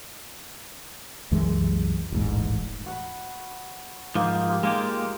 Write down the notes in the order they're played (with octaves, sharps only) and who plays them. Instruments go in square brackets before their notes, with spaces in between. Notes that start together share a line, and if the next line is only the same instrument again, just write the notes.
[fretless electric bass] C2 F#2 E3 G#3
D#1 A1 G#2
[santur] F#4 F#5 B5
[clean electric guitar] G#2 F3 [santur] A#3 D#4 C5
[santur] D#4 F4 G4
[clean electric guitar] G#3 A#3 G4 [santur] F4 D#6